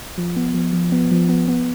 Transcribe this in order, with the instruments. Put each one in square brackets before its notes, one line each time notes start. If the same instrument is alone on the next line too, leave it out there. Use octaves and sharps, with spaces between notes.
[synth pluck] F3
B3
F3
F3
B3
F3
B3
B3